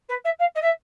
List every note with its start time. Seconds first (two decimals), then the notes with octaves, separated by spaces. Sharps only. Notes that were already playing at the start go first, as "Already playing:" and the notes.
0.09 B4
0.24 E5
0.39 F5
0.55 D#5
0.62 E5